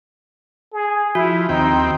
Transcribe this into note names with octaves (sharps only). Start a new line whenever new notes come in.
G#4
F3 E4 F#4
D#2 C4 D#4 G5